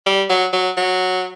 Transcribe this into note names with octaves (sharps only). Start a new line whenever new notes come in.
G3
F#3
F#3
F#3